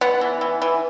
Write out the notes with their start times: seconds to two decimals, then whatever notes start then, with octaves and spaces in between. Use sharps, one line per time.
0.01 B3 F#5
0.21 E3
0.41 E3
0.62 E3